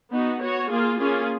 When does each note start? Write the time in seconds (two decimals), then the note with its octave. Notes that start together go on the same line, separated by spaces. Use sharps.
0.12 B3 D#4 F#4
0.41 B3 F#4 C#5
0.70 A#3 F4 G#4
0.99 A#3 C#4 F4 G#4